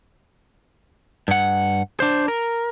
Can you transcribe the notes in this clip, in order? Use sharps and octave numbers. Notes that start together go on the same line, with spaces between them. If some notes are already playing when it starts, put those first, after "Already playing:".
G2 F#5
D4 C5
A#4